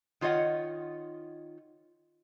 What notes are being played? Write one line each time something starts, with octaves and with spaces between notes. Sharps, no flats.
D#3 F4 C#5 D#5 F#5